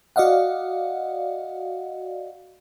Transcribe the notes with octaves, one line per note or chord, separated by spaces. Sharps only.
F#4 D5 D#5 F5 F#5